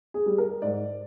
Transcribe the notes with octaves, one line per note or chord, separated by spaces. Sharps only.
G#4
G3
A#4
G#2 D5